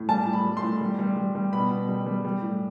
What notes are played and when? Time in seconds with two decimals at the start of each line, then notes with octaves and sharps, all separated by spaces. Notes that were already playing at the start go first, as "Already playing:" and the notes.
Already playing: A2
0.09 G3 A5
0.27 A2
0.33 B5
0.45 G3
0.57 C6
0.63 A2
0.81 G3
0.99 G3
1.17 G3
1.35 G3
1.53 B2 B5
1.71 B2
1.89 G3
2.06 G3
2.25 G3
2.42 A2